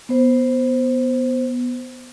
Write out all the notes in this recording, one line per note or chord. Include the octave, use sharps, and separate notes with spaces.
B3 C5